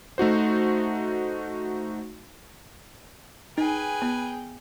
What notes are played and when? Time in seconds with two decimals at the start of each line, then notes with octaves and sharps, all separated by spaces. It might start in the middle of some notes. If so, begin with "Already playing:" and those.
0.18 A3 D#4 F#4 C5
3.58 D#4 G#4 B4 G5 G#5
4.02 B3